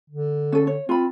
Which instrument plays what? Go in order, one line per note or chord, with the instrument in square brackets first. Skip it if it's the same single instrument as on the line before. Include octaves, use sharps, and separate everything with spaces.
[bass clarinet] D3
[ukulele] C#4 A4
C#5
[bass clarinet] C4 [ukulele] F4 B5